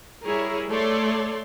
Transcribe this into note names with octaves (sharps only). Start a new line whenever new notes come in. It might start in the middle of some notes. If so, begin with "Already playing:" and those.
G3 E4 G#4 A#4 C#5
A3 A4 C#5 D5 C6